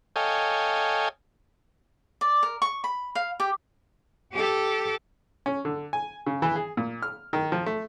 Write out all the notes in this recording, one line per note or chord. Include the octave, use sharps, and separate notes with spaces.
A4 C#5 D#5 F5 G5 G#5
D5
A#4
C#6
B5
F5
G4
G4 A4
C#4
D3
G#5
C#3
E3
G#4
A#2
F6
D#3
F3
A3